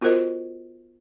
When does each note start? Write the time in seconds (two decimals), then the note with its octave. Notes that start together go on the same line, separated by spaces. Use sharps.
0.01 B3 F4 F#4 A#4 C5 D#5